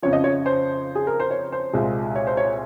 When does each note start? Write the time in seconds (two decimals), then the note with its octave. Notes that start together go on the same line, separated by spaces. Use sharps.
0.03 F2 C#3 F3 C#5
0.13 D#5
0.24 C#5
0.46 C5
0.95 G#4
1.07 A#4
1.20 C5
1.31 C#5
1.52 C5
1.73 C2 A#2 G#3
2.16 C#5
2.27 C5
2.37 C#5